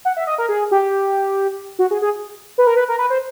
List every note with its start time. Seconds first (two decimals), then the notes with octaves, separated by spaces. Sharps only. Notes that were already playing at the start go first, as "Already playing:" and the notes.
0.05 F#5
0.17 E5
0.27 D#5
0.38 A#4
0.49 G#4
0.71 G4
1.79 F#4
1.91 G#4
2.02 G#4
2.58 B4
2.67 A#4
2.76 B4
2.88 A#4
2.99 B4
3.10 C5